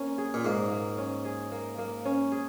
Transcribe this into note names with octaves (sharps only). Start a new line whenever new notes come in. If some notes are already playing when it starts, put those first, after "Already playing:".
Already playing: A#3 C#4
G#4
A#2
G#2 A#3
A#3
C#4
G#4
A#3
A#3
C#4
G#4